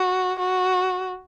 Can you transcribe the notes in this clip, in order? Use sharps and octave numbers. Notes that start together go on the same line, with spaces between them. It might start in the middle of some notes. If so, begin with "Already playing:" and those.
Already playing: F#4
F#4